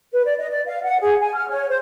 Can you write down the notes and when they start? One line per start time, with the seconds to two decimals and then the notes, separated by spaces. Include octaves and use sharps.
0.13 B4
0.26 D5
0.39 D#5
0.51 D5
0.66 F5
0.83 F#5
1.00 G#4
1.20 G#5
1.35 F6
1.49 C#5
1.68 C5